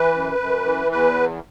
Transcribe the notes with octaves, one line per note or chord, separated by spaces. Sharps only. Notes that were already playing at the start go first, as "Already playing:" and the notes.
Already playing: E3 B4
F#2
F#2
E3
E2 B4